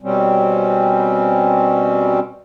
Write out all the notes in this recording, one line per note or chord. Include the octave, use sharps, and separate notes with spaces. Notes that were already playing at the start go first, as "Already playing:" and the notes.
B2 G3 C4 C#4